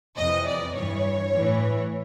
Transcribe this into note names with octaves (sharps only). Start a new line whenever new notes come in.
F2 C3 E3 D#5
D5
G2 E3 C#5
A2 E3